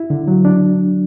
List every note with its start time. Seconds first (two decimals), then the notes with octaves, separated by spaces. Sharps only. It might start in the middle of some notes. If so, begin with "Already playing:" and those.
Already playing: E4
0.10 D3
0.28 F#3
0.45 D4